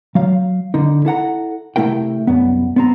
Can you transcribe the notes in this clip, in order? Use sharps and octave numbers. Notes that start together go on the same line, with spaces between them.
F#3 F5
D3 D#4
E4 A4 F#5 A#5
C3 A3 E4 A#4 G5
C2 F#2 B3
B3 C4 A#5